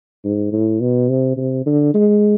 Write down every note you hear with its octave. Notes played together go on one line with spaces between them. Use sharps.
G#2
A2
B2
C3
C3
D3
G#3